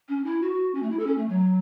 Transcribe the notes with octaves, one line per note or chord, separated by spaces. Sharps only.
C#4
E4
F#4
C#4
A3
E4
A4
C#4
A3
F#3